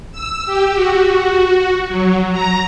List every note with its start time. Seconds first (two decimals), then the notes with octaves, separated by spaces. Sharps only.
0.12 E6
0.46 G4
0.75 F#4
1.89 F#3
2.32 A#5